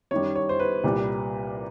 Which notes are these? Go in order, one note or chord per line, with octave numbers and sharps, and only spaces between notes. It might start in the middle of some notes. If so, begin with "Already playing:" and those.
F#2 D#3 G3 C#5
C#5
C5
B4
C2 A#2 G3